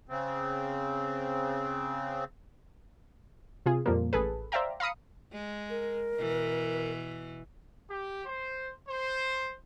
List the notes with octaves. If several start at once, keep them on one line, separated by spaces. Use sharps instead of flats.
C#3 C4
C3 F4 G#4
F2 A#2 F3 G3 A#3
A1 G#4 A4 B4
C5 D5 E5 F5 G5 A#5
F5 A#5 B5 D#6 C#7
G#3
A#4
B2 E3
G4
C5
C5